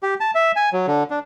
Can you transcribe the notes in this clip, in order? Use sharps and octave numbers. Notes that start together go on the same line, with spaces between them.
G4
A5
E5
G#5
F#3
D3
D4